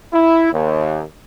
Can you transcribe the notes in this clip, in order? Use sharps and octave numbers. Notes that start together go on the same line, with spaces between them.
E4
D#2